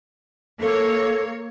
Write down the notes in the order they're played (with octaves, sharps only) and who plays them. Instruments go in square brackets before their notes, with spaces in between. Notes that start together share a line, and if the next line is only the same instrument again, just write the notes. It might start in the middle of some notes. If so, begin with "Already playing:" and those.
[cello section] A#3 C#5 [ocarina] A4